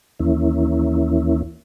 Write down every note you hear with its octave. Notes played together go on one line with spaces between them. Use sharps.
D#2 E3 A#3 C#4 E4